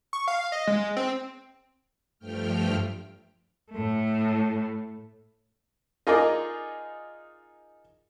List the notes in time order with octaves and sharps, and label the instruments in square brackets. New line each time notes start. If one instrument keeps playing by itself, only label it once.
[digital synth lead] C#6
F5
D#5
G#3
C4
[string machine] G2 F3 A3 G5 F6
[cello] A2 A3
[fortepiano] D#4 F4 G#4 A#4 D5 D#5